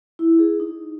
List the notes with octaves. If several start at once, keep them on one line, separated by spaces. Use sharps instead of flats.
E4
G#4
D#4